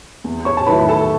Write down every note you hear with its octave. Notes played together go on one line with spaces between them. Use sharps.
E2
C#5 C#6
A5
D#3 F#3 A3 E4 B4 B5
B5
A4 A5